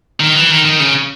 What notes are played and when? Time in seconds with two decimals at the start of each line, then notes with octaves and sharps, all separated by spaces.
0.20 D#3
0.35 E3
0.51 D#3
0.65 D#3
0.80 C#3